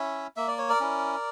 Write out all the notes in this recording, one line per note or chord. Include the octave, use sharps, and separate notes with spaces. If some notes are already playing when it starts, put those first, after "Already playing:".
Already playing: C#4 E4 C#5 E5
A#3 E5
D5
C#5
A#4 D5
C#4 E4